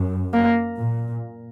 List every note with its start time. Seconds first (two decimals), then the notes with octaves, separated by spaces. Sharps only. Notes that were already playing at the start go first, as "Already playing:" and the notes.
Already playing: F#2
0.34 A#3
0.79 A#2